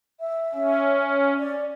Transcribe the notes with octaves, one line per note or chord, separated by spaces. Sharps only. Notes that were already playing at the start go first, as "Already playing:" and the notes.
E5
C#4
D5